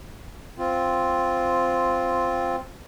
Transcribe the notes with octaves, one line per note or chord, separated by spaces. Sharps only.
C4 F4